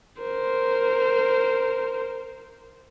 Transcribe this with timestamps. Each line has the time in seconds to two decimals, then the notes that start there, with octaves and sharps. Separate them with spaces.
0.22 A#4 C5